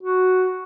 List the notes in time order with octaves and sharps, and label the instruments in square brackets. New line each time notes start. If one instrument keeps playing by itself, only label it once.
[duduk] F#4